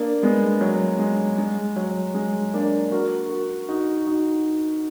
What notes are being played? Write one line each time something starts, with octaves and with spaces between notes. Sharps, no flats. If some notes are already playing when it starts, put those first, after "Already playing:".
Already playing: A#3 D4
G#3 B3
F#3
G#3
G#3
F#3
G#3
A#3 D4
F#4 A#4
F#4 A#4
D#4 F#4
D#4 F#4